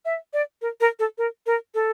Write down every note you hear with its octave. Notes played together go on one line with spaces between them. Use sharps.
E5
D5
A#4
A#4
A4
A#4
A#4
A4